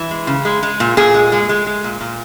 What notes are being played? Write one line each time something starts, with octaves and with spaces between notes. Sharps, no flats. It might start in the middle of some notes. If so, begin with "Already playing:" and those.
Already playing: E3
G#3
C#3
G#3
G#3
A#2
A#2 G#4
G#3
G#3
G#3
G#3
A#2
A#2